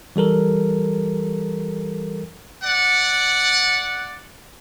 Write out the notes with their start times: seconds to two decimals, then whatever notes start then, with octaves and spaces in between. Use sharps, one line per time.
0.16 E3 G3 A4 A#4
2.63 D5 F#5